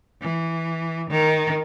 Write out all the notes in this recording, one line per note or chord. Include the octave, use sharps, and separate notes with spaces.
E3
D#3